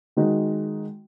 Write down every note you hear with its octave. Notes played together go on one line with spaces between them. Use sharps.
D#3 G#3 D#4 F#4